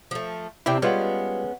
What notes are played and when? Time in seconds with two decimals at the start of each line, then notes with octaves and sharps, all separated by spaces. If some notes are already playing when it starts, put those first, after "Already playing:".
0.11 F3 A3
0.66 C3 C4 D4 E4 G5
0.82 G3 G#3 B3 C#4 F4 F#5